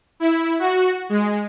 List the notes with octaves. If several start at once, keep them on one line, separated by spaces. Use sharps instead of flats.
E4
F#4
G#3